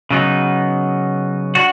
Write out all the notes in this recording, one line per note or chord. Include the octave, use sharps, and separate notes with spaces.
C#3 F#3 B3 D#4
D4 F#4